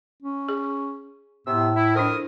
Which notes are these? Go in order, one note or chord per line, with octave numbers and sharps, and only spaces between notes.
C#4
G#4
A2 C3 B3 E6
E4
F2 D4 E4 A#4 C5 D#6